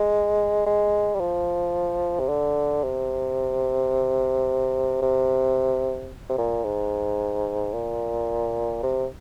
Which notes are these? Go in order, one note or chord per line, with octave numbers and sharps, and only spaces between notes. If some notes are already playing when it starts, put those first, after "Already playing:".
Already playing: G#3
G#3
G3
F3
C3
D3
C3
C3
C3
A#2
G#2
A#2
C3